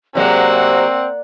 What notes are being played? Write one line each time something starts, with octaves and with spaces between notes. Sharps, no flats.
C3 F#3 G#3 A#3 C4 D5 F#5